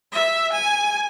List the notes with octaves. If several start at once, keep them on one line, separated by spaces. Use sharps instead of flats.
E5
G#5